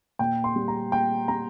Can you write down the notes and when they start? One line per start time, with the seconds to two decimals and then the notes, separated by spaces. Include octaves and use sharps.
0.19 A#2 G5
0.44 C6
0.56 G3
0.68 A#5
0.92 A#2 G5
1.28 G3 A#5